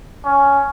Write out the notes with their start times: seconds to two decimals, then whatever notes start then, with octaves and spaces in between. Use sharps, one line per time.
0.25 C#4